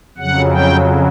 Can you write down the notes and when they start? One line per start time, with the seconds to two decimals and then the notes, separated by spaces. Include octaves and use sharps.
0.18 F2 C#3 F#3 F#5
0.53 G5